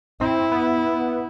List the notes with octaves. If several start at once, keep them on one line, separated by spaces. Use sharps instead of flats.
C4 E4
B3